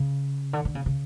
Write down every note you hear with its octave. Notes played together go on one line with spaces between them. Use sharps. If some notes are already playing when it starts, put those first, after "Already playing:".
Already playing: C#3
D3
D3
C#3
C#3